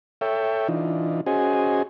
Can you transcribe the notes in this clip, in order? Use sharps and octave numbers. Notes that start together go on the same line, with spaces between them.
A4 C#5 E5 G5
E3 D4 D#4 F4
C#4 F#4 G#4 C5 D#5 G#5